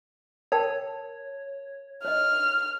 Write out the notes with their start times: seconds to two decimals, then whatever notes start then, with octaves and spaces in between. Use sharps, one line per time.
0.52 A#4 C#5 G5 A5
2.05 C#5 D#5 F6